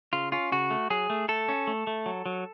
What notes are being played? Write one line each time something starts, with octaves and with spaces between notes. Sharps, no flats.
C#3 F4
C#4 F4
C#3 F#4
A3
F#3 G#4
A3
A3 A4
C#4
A3
A3
F#3
F#3